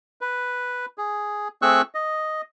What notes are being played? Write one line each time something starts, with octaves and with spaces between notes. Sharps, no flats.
B4
G#4
A3 C4 G#4 C#6 E6 F#6
D#5